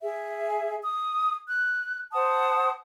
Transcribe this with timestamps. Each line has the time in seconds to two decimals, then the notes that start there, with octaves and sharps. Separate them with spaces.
0.01 G#4 E5
0.82 D#6
1.48 F#6
2.12 C5 F#5 A5 D#6